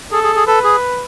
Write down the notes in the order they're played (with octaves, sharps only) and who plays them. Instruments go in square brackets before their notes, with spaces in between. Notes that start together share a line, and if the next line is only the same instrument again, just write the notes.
[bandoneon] G#4 [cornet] A4
[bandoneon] G#4
G#4
[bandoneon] A4 [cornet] B4
[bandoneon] G#4